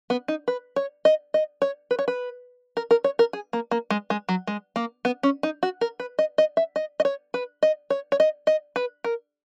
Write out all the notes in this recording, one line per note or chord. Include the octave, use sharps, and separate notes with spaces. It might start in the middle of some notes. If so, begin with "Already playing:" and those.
B3
D#4
B4
C#5
D#5
D#5
C#5
B4
C#5
B4
A#4
A#4
C#5
A#4
G#4
A#3
A#3
G#3
G#3
F#3
G#3
A#3
B3
C#4
D#4
F#4
A#4
B4
D#5
D#5
E5
D#5
D#5
C#5
B4
D#5
C#5
C#5
D#5
D#5
B4
A#4